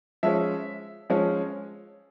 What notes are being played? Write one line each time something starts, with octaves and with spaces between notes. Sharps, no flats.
F3 G#3 C#4 E5
F3 G#3 C#4